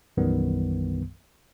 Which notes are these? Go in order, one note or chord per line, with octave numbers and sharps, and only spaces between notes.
B1 F#2 D#3 E3 G3 B3